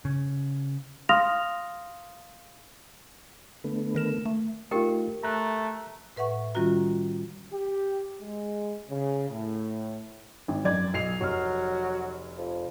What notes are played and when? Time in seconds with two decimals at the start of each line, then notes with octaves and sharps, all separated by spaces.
0.05 C#3
1.09 F5 C6 D#6 F6 A#6 F7
3.64 D3 A3 B3
3.95 D#3 A#4 E7
4.25 A3
4.71 A3 D#4 F4 G4 A#4 G5
5.23 A3 A#5 F#6
6.16 A2 B4 E5 F#5 C#6
6.55 D#3 G3 C#4 F4 F#4 A#5
7.52 G4
8.21 G#3
8.90 C#3
9.30 A2
10.48 G#1
10.65 F#2 D5 G#6
10.94 B1 C7 F7
11.21 F1 F#3 F6
12.38 F2